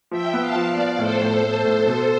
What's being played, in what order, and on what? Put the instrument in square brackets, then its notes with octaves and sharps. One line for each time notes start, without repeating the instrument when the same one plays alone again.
[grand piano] F3 [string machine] E5 G5
[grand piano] B3
[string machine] F5 A5
[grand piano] F3
[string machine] D5 F5
[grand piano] B3
[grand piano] A2 [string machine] A4 C5
[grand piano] A2
A2
A2
B2